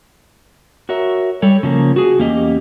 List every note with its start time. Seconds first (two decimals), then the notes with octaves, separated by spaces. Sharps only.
0.89 F#4 A#4 C#5 E5
1.42 G3 A4 C#5
1.63 C#3 F3 A#3
1.96 F#4 G#4
2.19 E2 A#3 C#4 G4 D#5